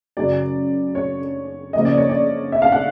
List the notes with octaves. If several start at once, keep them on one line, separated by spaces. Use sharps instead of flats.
F#2 C#3 F#3 D5
C#5
C#3 F3 A#3 D#5
D5
C#5
D5
E5
F5
F#5